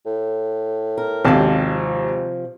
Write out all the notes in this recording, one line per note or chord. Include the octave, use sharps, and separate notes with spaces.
A2
A#4
G#1 D#2 C3 F3 A5